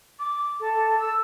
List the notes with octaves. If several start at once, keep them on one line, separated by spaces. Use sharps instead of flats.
D6
A4
E6